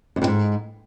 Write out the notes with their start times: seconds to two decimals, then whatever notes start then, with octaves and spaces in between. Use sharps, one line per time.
0.16 F#2
0.22 F2
0.27 G#2